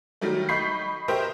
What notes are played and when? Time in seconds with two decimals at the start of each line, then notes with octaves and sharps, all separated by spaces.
0.21 D#3 F#3 G3 A3
0.49 D#5 B5 C#6 G6 B6 C7
1.08 G4 A#4 C5 D#5 E5 G5